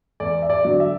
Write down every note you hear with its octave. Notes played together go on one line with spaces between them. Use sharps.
E2 D5
E5
D5
D3 F#3
E5